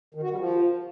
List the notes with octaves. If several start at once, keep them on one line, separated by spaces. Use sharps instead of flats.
D#3
F#4
G3
F3